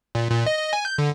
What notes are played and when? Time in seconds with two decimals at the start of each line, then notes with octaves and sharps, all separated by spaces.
0.15 A#2
0.30 A#2
0.46 D#5
0.59 D#5
0.73 G#5
0.85 G6
0.98 D3